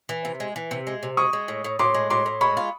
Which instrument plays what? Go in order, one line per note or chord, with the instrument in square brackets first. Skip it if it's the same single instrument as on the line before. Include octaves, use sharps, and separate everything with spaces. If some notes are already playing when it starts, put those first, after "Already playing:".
[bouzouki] E3
C3
G#3
E3
C3
G#3
C3
[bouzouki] G#3 [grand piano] C#6 D#6
[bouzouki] G#3
A2
A2
[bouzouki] A2 [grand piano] C6 D6
[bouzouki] G#3
[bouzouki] A2 [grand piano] C6 D6
[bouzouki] A2
[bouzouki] G#3 [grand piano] B5 C#6
[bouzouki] F4